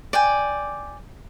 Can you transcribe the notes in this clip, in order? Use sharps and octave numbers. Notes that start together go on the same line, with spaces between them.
D5 G5 G#5